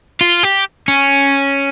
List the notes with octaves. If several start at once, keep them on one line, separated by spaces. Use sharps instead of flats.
F4
G4
C#4